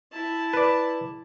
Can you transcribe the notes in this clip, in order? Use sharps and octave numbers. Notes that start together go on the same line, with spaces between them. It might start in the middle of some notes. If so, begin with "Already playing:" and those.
E4 A5
B4 D5